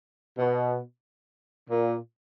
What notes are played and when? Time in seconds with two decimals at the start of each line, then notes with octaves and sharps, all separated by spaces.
0.38 B2
1.70 A#2